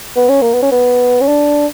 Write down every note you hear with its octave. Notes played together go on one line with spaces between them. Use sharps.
B3
C#4
A#3
B3
C#4
B3
C#4
D4